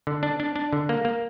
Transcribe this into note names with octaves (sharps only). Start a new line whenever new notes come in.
D3
D4
D4
D4
D3
A#3
A#3